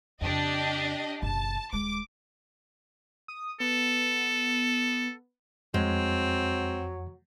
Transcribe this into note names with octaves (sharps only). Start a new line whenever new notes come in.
F2 C#3 D4 G4 D#5
F#1 B2 A5
D#1 G#3 D6
D#6
B3 A4
F2 F#3 G#3 C4